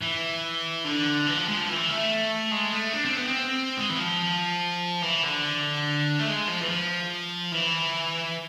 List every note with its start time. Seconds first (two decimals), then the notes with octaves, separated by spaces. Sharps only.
0.02 E3
0.85 D3
1.26 E3
1.37 F3
1.48 G#3
1.57 F3
1.68 E3
1.89 A3
2.52 G#3
2.72 A3
2.93 D4
3.05 C4
3.16 B3
3.28 C4
3.77 G#3
3.89 E3
3.97 F3
5.02 E3
5.23 D3
6.19 A3
6.27 G#3
6.48 F3
6.61 E3
6.69 F3
7.52 E3